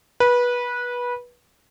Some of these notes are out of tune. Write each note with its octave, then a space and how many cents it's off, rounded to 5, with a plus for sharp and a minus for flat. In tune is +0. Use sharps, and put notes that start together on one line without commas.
B4 -20